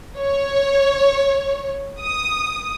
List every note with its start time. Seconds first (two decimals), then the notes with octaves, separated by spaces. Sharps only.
0.19 C#5
2.01 D#6